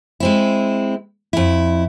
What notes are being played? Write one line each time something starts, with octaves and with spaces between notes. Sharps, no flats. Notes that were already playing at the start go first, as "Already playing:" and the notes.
G#3 C4 E4
F2 E4